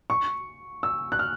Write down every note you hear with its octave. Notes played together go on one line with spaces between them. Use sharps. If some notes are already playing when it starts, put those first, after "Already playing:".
C#6
E6
F#6
F6